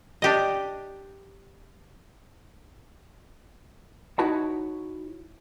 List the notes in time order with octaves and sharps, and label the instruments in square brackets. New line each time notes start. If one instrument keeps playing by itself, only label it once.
[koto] D4 G4 D#5
[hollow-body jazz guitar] D#4 E4 F#4 C#5 A5 B5